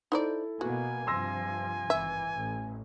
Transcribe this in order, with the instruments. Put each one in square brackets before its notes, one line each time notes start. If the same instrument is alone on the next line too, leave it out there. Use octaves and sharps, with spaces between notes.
[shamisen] D#4 C5 D5 [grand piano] E4 A4
[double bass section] B2 A#3 B3 [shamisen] F#4 [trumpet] G#5
[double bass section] G2 C3 F3 [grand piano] C6 E6 A#6
[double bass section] G#1 E3 [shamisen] E5
[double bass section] A1